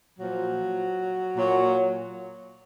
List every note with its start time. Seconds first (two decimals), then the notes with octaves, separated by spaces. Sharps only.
0.17 A#2 F3 F#3
1.36 A#2 F#3